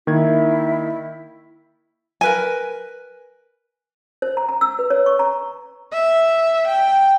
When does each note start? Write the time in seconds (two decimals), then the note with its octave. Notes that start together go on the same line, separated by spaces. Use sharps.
0.07 D#3 A#3 E4 G#6
2.21 A#4 B4 G#5
4.22 C5
4.37 A#5
4.49 A#5
4.61 E6
4.79 B4
4.90 C#5
5.06 C#6
5.19 A#5
5.92 E5
6.67 G5